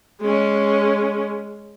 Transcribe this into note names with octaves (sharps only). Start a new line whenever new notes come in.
G#3 C#4